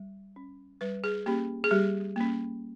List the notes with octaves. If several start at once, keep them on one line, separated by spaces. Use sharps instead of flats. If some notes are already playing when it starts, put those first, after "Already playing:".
Already playing: G3
C#4
G3 B4
G#4
A#3 C#4 G4
G#4
G3 G4
A#3 C#4